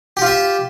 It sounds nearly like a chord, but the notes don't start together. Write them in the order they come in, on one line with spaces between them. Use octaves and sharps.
G4 F4 E5